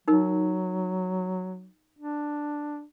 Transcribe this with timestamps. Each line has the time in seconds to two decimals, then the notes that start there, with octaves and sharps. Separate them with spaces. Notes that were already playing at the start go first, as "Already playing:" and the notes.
0.08 F#3 D#4 A#4
1.99 D4